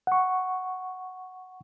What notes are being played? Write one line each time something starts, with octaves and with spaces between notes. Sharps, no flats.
F#5 C#6